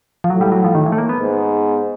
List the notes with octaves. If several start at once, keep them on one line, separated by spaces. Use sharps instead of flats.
F3
A2 F#3
G3
F#3
F3
D#3
E3
A3
A#3
B3
G#2